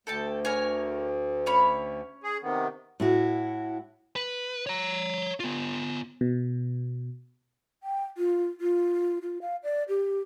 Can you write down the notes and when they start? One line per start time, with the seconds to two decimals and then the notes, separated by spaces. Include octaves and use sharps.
0.07 D2 A4 G5 A5
0.45 A#4 C#5 G#5
1.46 C#4 C#5 B5
2.23 G#4
2.42 C3 D#3 B3
3.00 A2 E4 F#4
4.16 B4
4.67 C#5 A#5
5.40 B3 F4
6.21 B2
7.83 G5
8.18 F4
8.61 F4
9.22 F4
9.42 F5
9.63 D5
9.89 G4